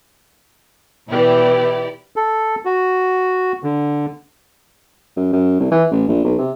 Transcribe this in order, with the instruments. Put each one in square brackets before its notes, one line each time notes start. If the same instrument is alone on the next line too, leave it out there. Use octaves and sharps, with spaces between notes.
[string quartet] B2 E3 [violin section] E4 G4 D5
[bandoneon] A4
F#4
D3
[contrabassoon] F#2
F#2
C2
E3
A1
A#1
B1
C3